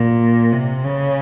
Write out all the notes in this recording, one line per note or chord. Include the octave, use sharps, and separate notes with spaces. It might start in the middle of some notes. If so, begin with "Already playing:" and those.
Already playing: A#2
C3
C#3